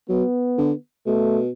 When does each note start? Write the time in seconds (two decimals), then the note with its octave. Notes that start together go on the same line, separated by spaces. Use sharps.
0.09 F#3 B3
0.58 D3
1.06 B2 A3